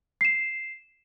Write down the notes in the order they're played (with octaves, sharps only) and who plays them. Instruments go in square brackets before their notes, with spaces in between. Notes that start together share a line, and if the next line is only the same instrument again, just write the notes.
[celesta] C7 E7